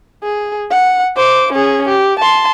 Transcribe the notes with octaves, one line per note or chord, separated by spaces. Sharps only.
G#4
F#5
C5 D6
C#4 G#4
G4
A5 C6